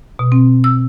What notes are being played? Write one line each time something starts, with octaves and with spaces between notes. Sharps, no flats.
B2
C4
E6